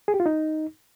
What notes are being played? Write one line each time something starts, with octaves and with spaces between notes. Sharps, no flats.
G#4
G4
F4
D#4